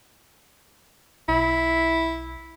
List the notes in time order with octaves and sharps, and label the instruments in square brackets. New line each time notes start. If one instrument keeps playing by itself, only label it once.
[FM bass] B1 [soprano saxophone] E4